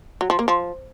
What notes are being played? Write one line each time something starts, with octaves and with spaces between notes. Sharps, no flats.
F#3
F3
A#3
F3